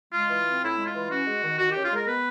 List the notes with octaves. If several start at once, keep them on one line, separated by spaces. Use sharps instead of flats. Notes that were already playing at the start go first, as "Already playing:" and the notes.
G#3 F4
E3
C4
A2 E4
G#3
F4
E3
C#4 F#4
G#3
D#3
D#3 F#4
C#4 G4
F4
G#3 A#4
B3 B4